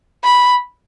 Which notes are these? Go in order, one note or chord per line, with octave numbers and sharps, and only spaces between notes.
B5